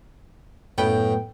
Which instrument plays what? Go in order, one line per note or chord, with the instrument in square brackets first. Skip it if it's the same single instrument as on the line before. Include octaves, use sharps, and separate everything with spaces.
[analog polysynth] F#2 B3 G5 [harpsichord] A2